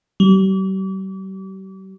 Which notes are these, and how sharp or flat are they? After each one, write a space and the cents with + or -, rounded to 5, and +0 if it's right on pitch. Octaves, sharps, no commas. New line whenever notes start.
G3 -40